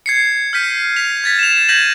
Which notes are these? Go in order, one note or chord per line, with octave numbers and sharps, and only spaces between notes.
G#6 C7 C#7
F6 G6 B6 D#7
B6 F7
G#6 A6 B6
E7 F7
G6 G#6 A#6 B6 D#7 F#7